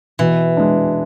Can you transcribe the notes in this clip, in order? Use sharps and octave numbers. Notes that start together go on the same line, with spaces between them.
B2 E3
G#3 D4